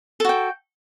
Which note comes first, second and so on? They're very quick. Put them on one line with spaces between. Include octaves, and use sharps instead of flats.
A4 F#4 G5